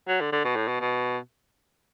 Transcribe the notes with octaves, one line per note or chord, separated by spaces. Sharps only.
F#3
D3
D3
B2
A2
B2
B2